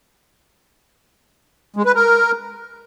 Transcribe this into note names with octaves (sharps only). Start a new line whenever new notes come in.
G#3
B4
A#4